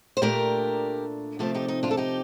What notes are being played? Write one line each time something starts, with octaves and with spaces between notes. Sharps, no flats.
C5
A#2 A3 D4 G4 A#4
C3 F3 A3 C4 F4 A4
D#4 G4
D#4
D4 F4
A4
D#4 G4